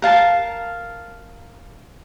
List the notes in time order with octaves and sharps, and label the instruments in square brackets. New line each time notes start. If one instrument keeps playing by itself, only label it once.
[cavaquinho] A#4 F5 A5